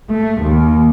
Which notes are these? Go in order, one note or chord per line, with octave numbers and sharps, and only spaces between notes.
A3
D#2